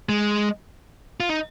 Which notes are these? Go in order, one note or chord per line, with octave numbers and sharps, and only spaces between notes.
G#3
F4
D#4